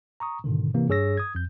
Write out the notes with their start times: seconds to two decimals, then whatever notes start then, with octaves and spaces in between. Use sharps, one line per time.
0.20 A#5 C#6 D#6
0.44 G#2 B2 D3 D#3
0.74 C3 E3 A#3
0.89 G2 G#4 C#5 E6 A#6
1.17 D#6 G#6
1.35 F2 G6